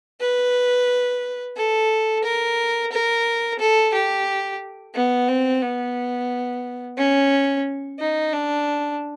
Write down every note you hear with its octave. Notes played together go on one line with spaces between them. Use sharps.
B4
A4
A#4
A#4
A4
G4
B3
C4
B3
C#4
D#4
D4